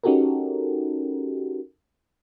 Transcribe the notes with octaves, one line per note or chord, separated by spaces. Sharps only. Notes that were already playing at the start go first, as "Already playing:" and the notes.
C#4 D#4 F#4 G4 A4 A#4